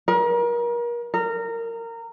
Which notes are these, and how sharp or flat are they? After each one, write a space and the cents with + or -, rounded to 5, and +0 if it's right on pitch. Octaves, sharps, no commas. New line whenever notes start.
A#4 +35
A#4 -20